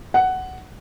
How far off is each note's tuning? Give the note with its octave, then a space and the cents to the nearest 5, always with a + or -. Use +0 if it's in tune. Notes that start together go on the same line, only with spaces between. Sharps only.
F#5 +10